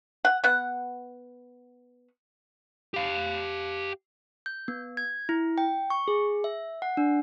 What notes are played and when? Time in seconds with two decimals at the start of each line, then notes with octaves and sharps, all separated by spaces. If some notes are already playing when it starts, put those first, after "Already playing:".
0.25 F#5
0.44 B3 F#5
2.94 G4 F5
4.46 G6
4.68 B3
4.97 G#6
5.29 E4
5.58 G5
5.90 C#6
6.08 G#4
6.44 E5
6.82 F#5
6.97 D4